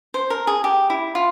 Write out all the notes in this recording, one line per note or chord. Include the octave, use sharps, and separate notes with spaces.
C5
A#4
G#4
G4
E4
F4